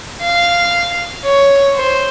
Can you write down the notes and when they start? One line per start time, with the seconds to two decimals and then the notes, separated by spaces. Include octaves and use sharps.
0.23 F5
1.25 C#5
1.76 C5